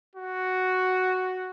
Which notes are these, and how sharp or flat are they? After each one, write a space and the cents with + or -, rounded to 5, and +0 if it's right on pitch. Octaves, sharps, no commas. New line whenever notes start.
F#4 +0